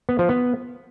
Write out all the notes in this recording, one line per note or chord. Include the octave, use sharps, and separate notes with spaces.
B3
F3
B3